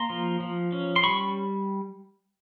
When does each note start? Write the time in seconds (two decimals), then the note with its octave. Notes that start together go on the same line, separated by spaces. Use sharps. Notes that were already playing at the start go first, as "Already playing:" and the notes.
Already playing: A#3 A#5 C6
0.10 F3
0.40 F3
0.72 C#4
0.96 C6
1.03 G3 B5 C#6